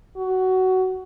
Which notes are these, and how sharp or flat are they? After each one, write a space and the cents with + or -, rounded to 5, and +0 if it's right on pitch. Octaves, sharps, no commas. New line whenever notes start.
F#4 +15